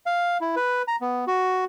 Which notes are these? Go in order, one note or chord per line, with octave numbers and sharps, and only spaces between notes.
F5
E4
B4
A#5
B3
F#4